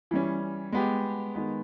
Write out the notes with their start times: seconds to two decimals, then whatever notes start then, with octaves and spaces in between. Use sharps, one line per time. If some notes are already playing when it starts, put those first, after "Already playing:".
0.11 E3 G3 C#4
0.72 G#3 B3 G4
1.35 D#3 G#3 B3